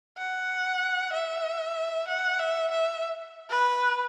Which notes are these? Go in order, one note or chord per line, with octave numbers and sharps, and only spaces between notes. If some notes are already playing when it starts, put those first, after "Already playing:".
F#5
E5
F#5
E5
E5
B4